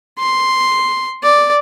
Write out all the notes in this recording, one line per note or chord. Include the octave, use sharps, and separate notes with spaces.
C6
D5